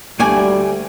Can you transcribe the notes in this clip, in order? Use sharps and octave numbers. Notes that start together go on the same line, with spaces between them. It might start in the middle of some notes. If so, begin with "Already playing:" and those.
D2 G3 A3 D5 G#5